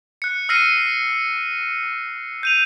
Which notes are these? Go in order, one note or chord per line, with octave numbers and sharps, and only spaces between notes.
F#6 C#7
E6 F6 A#6 C7 C#7 D#7
G6 D#7 F7